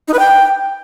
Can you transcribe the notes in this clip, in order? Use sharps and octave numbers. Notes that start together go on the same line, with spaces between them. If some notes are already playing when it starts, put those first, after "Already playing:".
D#4
B4
G5